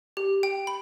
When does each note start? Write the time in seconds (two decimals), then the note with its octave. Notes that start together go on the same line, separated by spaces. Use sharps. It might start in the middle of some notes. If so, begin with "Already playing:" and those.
0.17 G4
0.43 G5
0.67 B5